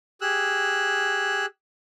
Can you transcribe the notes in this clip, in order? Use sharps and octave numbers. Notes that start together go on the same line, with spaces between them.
G4 G#4 E6 F#6